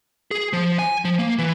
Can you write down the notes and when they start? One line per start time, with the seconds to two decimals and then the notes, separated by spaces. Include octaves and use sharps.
0.31 G#4
0.53 F3
0.79 G#5
1.05 F3
1.18 A#3
1.39 E3